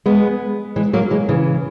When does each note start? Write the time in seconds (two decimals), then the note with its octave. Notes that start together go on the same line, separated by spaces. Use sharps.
0.06 G#3 B3
0.76 E3 G#3
0.93 F#3 A#3
1.11 E3 G#3
1.29 C#3 E3